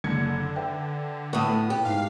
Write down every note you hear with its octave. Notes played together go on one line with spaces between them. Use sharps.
F#1 D3 G#6 C#7
B4 E5 G5
A2 B3 F#5 C#6 D#6
G4
G#2 F5